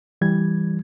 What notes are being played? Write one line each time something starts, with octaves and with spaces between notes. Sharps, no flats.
E3 G3 G#6